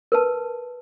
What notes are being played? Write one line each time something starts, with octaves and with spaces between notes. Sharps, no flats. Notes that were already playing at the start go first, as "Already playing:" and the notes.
A#4 B4 A5